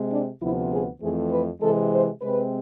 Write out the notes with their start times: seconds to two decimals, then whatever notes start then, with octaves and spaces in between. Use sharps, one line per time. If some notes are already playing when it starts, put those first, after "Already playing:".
Already playing: C3 G#3 C4
0.11 D4
0.40 D2 C3 F3 B3 E4
0.71 G#4
1.01 F2 E3 A3 C4 G#4
1.31 B4
1.60 C3 E3 G#3 C4 A4
1.91 C5
2.20 C3 G#3 C4 B4